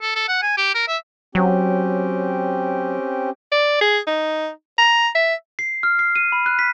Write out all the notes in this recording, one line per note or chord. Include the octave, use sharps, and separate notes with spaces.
A4
A4
F#5
G#5
G4
A#4
E5
F#3 C4 C#4 G4
D5
G#4
D#4
A#5
E5
C7
F6
C7
D#7
B5
F#6
B6